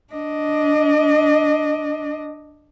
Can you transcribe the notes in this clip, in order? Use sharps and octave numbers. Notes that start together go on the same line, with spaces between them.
D4 D#5